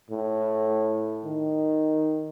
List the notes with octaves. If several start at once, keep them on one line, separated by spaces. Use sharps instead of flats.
A2
D#3